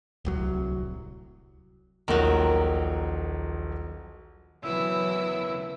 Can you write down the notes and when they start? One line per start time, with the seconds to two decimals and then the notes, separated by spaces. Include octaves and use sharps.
0.25 D1 C2 F#3
2.08 D#1 A#1 D#3 F#3 A#5
4.63 C#3 E3 F#3 B3 E4 E6